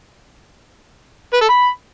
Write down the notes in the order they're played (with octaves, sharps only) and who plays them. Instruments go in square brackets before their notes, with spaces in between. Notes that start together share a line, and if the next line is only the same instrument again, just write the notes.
[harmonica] B4
A4
B5